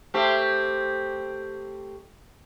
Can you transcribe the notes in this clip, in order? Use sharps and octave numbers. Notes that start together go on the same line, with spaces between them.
A3 C4 G4